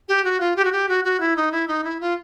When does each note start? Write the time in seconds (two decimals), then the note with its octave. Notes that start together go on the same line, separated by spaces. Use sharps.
0.08 G4
0.24 F#4
0.40 F4
0.56 G4
0.65 F#4
0.72 G4
0.89 F#4
1.04 F#4
1.20 E4
1.36 D#4
1.52 E4
1.68 D#4
1.84 E4
2.01 F4